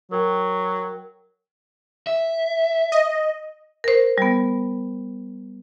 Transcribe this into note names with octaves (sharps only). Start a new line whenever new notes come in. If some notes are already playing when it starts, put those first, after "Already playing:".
F#3 A#4 G5
E5
D#5
A#4 C5
G3 B3